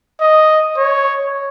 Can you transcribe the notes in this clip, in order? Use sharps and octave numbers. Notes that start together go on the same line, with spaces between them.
D#5
C#5